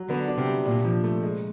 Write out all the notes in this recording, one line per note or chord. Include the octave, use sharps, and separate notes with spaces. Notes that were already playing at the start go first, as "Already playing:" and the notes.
Already playing: F#3
D3 B3
D4
C3
G3
A#2 D4
F3
A3
G#3